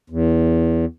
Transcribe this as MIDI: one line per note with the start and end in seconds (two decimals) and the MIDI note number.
0.10 0.85 40